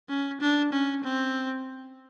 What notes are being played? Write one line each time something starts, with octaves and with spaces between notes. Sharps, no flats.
C#4
D4
C#4
C4